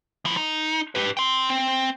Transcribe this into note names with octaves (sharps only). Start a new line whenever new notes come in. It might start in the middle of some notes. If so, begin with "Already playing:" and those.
F3 E4
D#4
G4 B4
G5 C6
C4